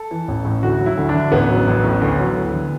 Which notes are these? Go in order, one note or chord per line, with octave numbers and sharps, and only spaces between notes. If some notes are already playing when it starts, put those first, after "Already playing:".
Already playing: A4
E3
A1
A2
D2 F#4
F#3
E4
D2
D4
D3
A1 B3
F#3
A1
A2
D2
F#3
D2
D3